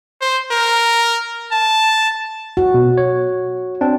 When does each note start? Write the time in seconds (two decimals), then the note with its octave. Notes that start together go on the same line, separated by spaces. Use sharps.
0.21 C5
0.52 A#4
1.52 A5
2.57 F#4
2.74 B2
2.98 C#5
3.81 C4 D4